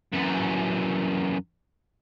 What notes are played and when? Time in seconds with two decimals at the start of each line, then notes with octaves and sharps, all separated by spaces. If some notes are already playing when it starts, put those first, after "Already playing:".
0.13 F#2 E3